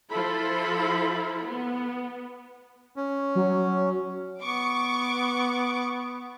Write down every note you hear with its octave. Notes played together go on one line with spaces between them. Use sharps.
F3 E4 F4 A4 C5 B5
B3
C#4
F#3
B3 C#6 D6